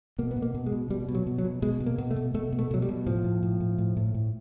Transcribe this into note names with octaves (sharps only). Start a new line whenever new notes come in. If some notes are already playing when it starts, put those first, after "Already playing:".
B2 A#3
B3
B2
A#3
B2
G#3
B2
B2 G3
B2
F#3
B2
F#3
B2
B2 G#3
B2
A#3
B2
A3
B2
B2 A3
B2
A3
B2 F#3
G3
B2
A2 F3
A2
A2
A2
A2
A2
A2